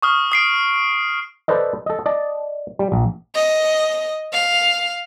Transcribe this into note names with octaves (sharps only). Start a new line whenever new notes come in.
C#6 D#6 F6
D#6 C7 D7
A4 B4 C5 D5 D#5
A4 D#5
D5 D#5 A5
G3
A#1
D#5
F5